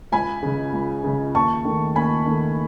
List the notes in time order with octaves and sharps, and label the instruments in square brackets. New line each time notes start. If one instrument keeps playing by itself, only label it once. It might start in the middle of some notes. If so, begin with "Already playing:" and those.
[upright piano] C#2 G#5 B5
C#3 G#3
C#2
C#3 G#3
D#2 A5 C#6
D#3 A3
D#2 G#5 B5
D#3 A3